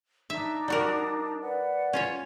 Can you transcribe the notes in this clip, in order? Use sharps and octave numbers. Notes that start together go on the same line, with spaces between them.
D4 D#4 E5
G3 F#4 A#4
B4 D5 F#5
C#4 F4 C#5